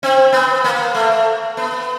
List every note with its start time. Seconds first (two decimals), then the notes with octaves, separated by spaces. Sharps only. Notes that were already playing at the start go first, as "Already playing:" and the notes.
0.03 C4
0.33 B3
0.64 A#3
0.94 A3
1.57 B3